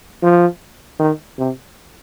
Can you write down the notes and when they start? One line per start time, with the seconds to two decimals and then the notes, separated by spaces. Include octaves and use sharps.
0.23 F3
0.99 D#3
1.38 C3